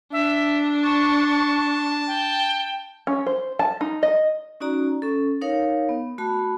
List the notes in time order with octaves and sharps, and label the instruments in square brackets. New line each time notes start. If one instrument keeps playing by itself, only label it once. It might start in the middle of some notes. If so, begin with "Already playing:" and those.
[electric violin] D4 [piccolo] E5
[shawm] A5 [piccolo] C#6
[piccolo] G5
[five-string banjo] C#4
C5
A5
D#4
D#5
[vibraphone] C#4 D#4 F#4 D5 A#5
C#4 A4
D#4 A#4 C#5 F5
B3
A3 F#4 A5 B5